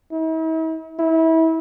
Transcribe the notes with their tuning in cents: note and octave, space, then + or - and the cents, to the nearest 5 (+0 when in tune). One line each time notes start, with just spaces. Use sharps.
E4 -45
E4 -30